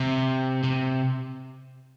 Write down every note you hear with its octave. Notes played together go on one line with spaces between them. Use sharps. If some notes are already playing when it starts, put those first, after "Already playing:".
Already playing: C3
C3